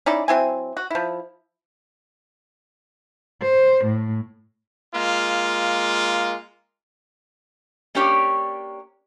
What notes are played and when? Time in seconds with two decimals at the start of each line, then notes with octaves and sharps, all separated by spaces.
0.06 C#4 D#4 E4 D5
0.28 F#3 C4 E4 G#5
0.77 F#4
0.90 F3 E4
3.42 C5
3.85 A2
4.94 G#3 A#3 F4
7.95 A#3 C#4 D4 G4 C#5 D5